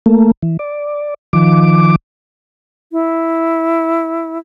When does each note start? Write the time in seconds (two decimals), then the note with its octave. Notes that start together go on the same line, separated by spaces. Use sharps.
0.06 A3 A#3
0.42 E3
0.59 D5
1.33 D#3 F3 D6
2.91 E4